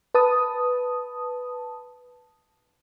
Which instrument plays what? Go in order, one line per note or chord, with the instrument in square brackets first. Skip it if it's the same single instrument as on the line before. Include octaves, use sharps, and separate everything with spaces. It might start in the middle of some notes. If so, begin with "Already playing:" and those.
[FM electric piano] B4 A5 D#6